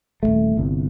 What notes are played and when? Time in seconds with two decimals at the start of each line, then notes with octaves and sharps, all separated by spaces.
0.23 D#1 F2 A3
0.57 G1 C2